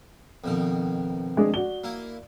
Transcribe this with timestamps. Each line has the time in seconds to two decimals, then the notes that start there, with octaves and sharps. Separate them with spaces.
0.44 F2 B2 D#3
1.37 G#3 D4 G#4
1.54 F#4 D5 G7
1.84 A#3 E4